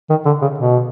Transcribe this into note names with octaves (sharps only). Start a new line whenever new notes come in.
D#3
D3
C#3
B2